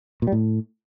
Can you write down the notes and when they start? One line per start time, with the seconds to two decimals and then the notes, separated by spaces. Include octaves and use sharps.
0.22 A#2
0.27 G3
0.32 A2